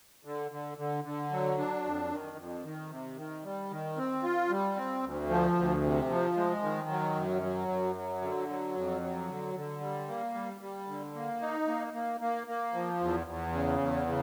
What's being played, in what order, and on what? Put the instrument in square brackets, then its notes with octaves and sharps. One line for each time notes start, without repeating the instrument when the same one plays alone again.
[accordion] D3
D3
D3
D3
F#3
D4
F2
D#3
F2
D#3
C3
D#3
G3
D#3
C4
F4
G3
C4
D2
F3
D2
C3
F3
G#3
D#3
F#3
F#2
F#3
F#2
F#3
D3
F#3
F2
F#3
D3
D3
G3
A#3
G3
G3
D3
A#3
D#4
A#3
A#3
A#3
A#3
F3
E2
E2
C#3
E2
C#3